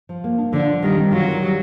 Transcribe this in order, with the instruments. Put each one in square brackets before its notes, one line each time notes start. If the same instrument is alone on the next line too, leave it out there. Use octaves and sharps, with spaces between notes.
[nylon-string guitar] F3
A#3
D4
[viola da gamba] D3 [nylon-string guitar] F3
[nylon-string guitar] F3
[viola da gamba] D#3 [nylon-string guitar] G3
[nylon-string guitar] C4
[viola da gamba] F#3 [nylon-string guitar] F4
[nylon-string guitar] D#3
G3